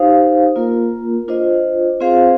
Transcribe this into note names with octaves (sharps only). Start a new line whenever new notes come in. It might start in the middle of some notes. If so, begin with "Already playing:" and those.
Already playing: D#4 G4 C5 F5
A#3 F4 A#4
D4 F4 C5 D#5
C4 F4 G#4 C5 F5